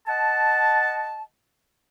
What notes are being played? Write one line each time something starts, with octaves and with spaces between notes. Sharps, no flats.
D#5 F#5 A5